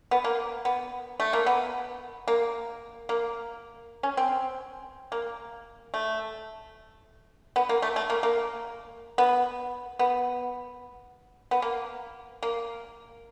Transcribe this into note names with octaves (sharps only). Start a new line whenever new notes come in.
B3
A#3
B3
A3
A#3
B3
A#3
A#3
C#4
C4
A#3
A3
B3
A#3
A3
A3
A#3
A#3
B3
B3
B3
A#3
A#3